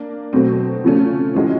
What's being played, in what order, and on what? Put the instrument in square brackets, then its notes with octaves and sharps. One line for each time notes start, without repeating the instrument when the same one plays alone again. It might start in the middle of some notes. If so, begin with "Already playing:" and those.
Already playing: [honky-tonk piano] A#3 D4
B2 F#3 A3 C4
C#3 F3 A3 C#4
E3 G#3 C#4 F#4